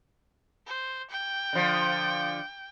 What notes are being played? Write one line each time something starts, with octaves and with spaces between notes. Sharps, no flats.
C5
G5
D3 F3